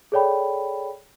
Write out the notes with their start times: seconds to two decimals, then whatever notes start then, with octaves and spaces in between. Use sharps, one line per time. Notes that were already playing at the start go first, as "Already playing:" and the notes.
0.12 G#4 A4 C#5 D5 G5 B5